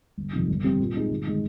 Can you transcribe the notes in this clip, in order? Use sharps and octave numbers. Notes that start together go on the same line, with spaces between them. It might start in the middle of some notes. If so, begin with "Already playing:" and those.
G1
F2 C3 D#3
G1
G2 G3 C4 G4
A#2
G#3 C4 D#4 G#4
G1
D#3 G#3